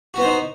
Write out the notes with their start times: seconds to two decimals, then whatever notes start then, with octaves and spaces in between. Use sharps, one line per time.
0.14 F#4
0.18 B3
0.21 C5
0.25 D#4